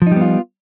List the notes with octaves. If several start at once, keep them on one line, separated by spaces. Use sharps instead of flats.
F3 G3 B3 D#4 F4